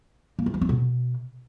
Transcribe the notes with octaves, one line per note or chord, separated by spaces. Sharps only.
A#3
E3
F3
C4
B2